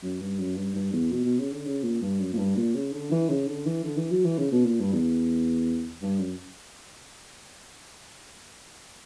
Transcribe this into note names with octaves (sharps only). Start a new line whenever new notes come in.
F#2
G2
F#2
G2
G2
E2
B2
B2
C#3
D3
C#3
A#2
G2
F#2
A#2
G2
A#2
C#3
D3
E3
C#3
D3
E3
D3
E3
F#3
E3
C#3
B2
A#2
G2
E2
G2
F#2